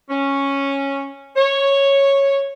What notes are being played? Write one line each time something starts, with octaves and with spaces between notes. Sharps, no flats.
C#4
C#5